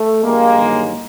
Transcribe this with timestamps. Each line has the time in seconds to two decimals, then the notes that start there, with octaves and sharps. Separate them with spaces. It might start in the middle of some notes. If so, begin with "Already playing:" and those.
Already playing: A3
0.23 A#1 A#2 G3 G#3 A#3
0.58 G1 G2 D#3 F#3